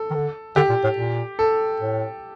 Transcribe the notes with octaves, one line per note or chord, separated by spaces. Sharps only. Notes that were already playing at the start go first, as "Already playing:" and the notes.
Already playing: A4
D#3
D3
D3 G4
A#2
A2
A#2
A4
A2